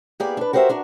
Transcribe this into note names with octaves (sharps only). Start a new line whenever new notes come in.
A#3 B3 G4 G#4 D5
D4 B4
F#4 G4 A#4 C5 C#5 E5
D4 F#4 A#4